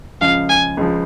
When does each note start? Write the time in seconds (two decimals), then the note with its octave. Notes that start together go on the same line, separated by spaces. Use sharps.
0.21 C#2 C#3 F3 F5
0.49 G#5
0.77 C#2 C#3 F3